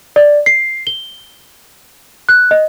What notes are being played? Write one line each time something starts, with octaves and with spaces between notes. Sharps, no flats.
D5
C7
G7
F#6
D#5